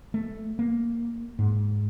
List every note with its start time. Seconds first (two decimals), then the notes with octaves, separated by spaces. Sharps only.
0.14 A3
0.59 A#3
1.39 G#2